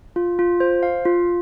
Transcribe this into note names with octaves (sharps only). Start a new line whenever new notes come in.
F4
F4
C5
F5
F4